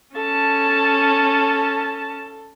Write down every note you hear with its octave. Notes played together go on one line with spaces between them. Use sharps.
C#4 A4 A5